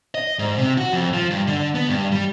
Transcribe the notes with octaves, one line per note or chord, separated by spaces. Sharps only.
D#5
G#2
C3
F#4
F2
F3
G2
D3
B3
G2
G3